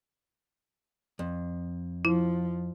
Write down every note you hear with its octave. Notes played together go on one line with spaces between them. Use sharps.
F2
F3 E4